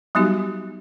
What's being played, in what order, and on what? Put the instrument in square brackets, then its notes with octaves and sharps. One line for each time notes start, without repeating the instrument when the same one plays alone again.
[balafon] F#3 G3 B3 D#4 F#4 G4